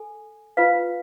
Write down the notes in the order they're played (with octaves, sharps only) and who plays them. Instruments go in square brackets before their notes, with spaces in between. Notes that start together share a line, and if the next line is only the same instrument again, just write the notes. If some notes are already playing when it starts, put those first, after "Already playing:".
Already playing: [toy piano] A4 G#5
F4 B4 F5